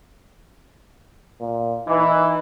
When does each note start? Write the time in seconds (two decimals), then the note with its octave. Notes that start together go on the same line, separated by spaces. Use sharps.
1.41 A#2
1.87 E3 D#4